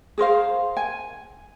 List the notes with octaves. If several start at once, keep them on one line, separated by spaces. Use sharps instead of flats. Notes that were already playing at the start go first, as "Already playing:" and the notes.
G#4 A#4 C5 F5
G#5